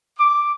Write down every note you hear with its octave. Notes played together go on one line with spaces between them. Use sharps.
D6